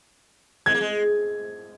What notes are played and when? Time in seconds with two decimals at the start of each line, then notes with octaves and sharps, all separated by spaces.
0.66 G#3 G#6
0.74 A#3
0.81 G#3